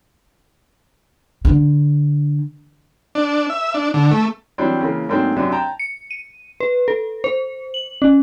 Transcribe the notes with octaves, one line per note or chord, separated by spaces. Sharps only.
D3
D4
E5
D4
D3
A3
E3 F#3 G3 C4 D4
C#3 E3 A#3
G#2 F#3 A3 A#3 C4 D4
F#2 C3 F#3 D4
G5 A5 A#5
C#7
D#7
B4
A4
C5
F#7
C#4